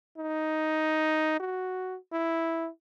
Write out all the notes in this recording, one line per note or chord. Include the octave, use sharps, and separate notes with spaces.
D#4
F#4
E4